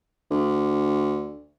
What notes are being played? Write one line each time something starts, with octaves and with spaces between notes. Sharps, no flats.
D2